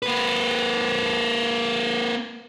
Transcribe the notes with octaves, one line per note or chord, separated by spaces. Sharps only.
A#3 B4